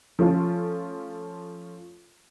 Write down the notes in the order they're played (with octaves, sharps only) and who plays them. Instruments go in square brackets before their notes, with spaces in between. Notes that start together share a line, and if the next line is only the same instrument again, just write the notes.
[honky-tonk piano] F3 A3 C#4 F4